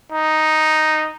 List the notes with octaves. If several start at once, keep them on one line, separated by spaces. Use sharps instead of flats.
D#4